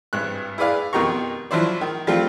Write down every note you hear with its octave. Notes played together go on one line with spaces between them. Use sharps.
G#1 G2 F#6
E4 G#4 B4 D5 F5
F2 B2 D#3 G4 A#5 C#6
F3 F#3 D4 E4 C5 D5
D#3
F3 G3 A3 C4 F4